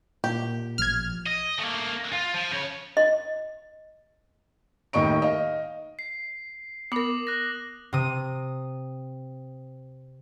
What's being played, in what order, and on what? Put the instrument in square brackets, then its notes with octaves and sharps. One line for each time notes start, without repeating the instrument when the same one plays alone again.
[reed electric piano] A#2 [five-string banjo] G4
[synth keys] A1 F3 [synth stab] F6 G#6
[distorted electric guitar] D#5
A3 A#3
F4
F3
C#3 C#5
[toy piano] D#5
[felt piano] D#2 A2 D#3 D#5 C#6 D7
D#5 F5
[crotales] C7
[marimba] B3 A#4 [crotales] D6 D#6 F#7
[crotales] F#6 A#6
[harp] C3 D#6